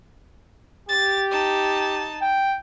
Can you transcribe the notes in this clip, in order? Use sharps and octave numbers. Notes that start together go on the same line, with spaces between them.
G4 A6
D#4 A5
G5